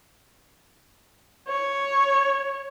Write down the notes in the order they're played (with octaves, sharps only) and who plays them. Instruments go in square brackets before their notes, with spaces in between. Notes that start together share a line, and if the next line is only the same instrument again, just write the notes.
[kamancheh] C#5